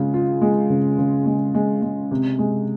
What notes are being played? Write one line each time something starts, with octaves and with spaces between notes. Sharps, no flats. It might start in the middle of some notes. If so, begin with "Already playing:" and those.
Already playing: C#3 G#3 F4
F4
G#3
C#3
C#3
G#3
G#3
G#3
C3
G#3